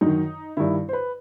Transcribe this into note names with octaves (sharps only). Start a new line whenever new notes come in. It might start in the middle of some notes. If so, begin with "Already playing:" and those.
F#2 D#4
D#3
G2 D#3 E4
C5
B4